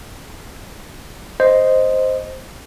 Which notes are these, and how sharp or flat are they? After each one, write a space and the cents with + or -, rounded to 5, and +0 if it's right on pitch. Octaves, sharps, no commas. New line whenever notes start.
C5 +0 D#5 +0